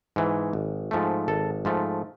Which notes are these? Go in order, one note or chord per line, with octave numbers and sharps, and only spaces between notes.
G#2 E3
G#1
G#2 F3 A3
G#1 A4
G#2 F3 A3